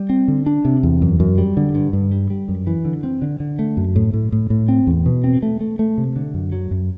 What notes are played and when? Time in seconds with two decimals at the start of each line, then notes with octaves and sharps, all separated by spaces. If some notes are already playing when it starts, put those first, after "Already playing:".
Already playing: G3
0.10 C4
0.28 D3
0.46 D4
0.65 C3
0.83 E2
1.02 F#2
1.20 F#2
1.38 G3
1.57 D3
1.75 G2
1.93 G2
2.12 G3
2.30 G3
2.49 F#2
2.67 E3
2.85 D3
3.04 C4
3.22 D3
3.40 D3
3.59 A3
3.77 F#2
3.96 A2
4.14 A2
4.32 A2
4.50 A2
4.69 C4
4.87 E2
5.06 B2
5.24 C4
5.42 A3
5.61 A3
5.79 A3
5.98 C3
6.16 D3
6.34 F#2
6.52 F#3
6.71 F#2